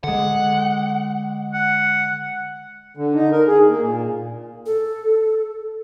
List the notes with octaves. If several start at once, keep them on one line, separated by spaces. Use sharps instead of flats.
D3 G#3 F#5
F#5
D3
D#4
A#4
G#4
A#3
A#2
A4